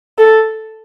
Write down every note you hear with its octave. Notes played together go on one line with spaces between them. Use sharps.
A4